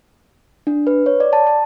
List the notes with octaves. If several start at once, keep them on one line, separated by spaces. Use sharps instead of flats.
D4
B4
C#5
D5
A5
A5